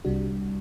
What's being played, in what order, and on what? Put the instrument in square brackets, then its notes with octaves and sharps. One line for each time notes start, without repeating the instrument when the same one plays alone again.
[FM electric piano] C2 C3 G3 D4 F#4